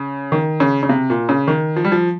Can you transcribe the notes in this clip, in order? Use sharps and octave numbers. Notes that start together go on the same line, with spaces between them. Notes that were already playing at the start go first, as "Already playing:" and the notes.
Already playing: C#3
D#3
C#3
C#3
C3
A#2
C#3
D#3
F3
G3
F3